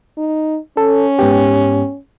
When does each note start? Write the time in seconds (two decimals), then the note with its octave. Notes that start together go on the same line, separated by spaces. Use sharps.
0.17 D#4
0.77 C#4 A4
1.19 G#2 B3 G4